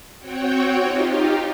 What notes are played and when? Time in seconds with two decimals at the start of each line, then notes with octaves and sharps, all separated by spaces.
0.19 C4 F#4 C#5 G5
0.80 D#4 F4 G4